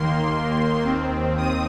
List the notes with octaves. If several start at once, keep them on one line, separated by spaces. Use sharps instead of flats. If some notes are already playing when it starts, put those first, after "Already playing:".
Already playing: D#2 D#3 A#3 C6
D#2 D#3 C4
D#6